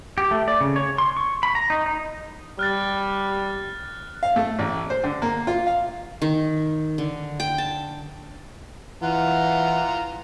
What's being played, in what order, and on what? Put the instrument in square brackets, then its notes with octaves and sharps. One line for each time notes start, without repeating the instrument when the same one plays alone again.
[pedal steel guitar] G4
A3
D5
C#3
C#5
C6
C#6
B5
A#5
D#4
D#4
[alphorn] G3 [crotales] F6 F#6 A6
[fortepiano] F5
A3
A1
C5
D3
A#3
F4
F5
[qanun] D#3
D3
G5
A5
[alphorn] E3 [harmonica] F4 A#5 [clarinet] F#5